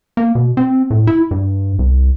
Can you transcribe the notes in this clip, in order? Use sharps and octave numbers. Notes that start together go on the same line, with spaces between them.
A#3
B2
C4
A2
E4
G2
C2